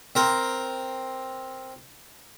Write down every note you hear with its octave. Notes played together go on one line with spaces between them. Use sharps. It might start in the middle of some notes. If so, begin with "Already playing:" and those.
C4 A#4